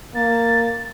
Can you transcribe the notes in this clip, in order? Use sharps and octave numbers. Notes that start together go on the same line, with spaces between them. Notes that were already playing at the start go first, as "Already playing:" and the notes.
A#3 A6